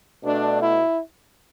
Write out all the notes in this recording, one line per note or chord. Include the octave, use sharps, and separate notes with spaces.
B2 A3 D4
E4